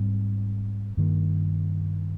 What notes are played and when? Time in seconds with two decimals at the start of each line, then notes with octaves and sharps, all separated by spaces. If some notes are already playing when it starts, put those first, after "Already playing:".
Already playing: G#2 G3 C4
0.97 G2 D#3 A#3